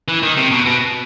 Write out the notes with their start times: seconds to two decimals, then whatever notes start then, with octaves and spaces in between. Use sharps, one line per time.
0.08 E3
0.23 D#3
0.37 C3
0.52 B2
0.66 B2